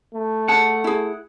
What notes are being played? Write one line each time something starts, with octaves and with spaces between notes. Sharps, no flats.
A3
G#4 C#5 F#5 A5
E4 G#4